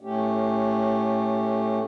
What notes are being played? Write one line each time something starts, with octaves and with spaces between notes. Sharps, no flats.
A2 A3 C#4 G4